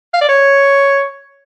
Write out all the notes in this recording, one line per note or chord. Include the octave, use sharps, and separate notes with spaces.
F5
D5
C#5